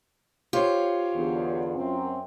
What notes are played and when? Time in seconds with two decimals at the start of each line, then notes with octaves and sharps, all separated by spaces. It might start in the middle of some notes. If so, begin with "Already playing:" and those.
0.53 F4 G4 C5 C#5
1.14 E2 D3
1.76 F#2 C4 A#4